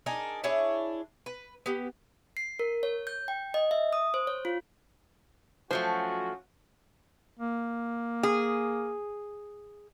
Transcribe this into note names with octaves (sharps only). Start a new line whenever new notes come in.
D4 D#4 G#4 A#4
D4 E4 G#4 C#5
B4
B3 G4
C7
A#4
C#5
G6
G5
D#5
E5
D#6
C5
C#5
F4
F3 F#3 A3 C#4 F4 F#4 C5
A#3
G#4